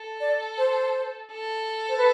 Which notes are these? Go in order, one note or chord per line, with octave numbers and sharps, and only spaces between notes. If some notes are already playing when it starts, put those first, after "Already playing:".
Already playing: A4
D5
C5
A4
C5
B4